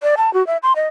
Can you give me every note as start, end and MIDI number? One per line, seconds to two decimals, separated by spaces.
0.03 0.15 74
0.17 0.33 81
0.34 0.45 66
0.47 0.57 76
0.63 0.73 84
0.76 0.87 75